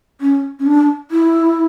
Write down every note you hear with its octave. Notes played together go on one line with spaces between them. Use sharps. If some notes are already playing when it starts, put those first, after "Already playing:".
C#4
C#4
D4
E4